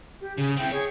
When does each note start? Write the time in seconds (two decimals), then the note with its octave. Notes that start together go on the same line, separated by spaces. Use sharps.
0.21 G4
0.38 C#3 G#4
0.57 C4 E4 G5
0.73 G#4 C#5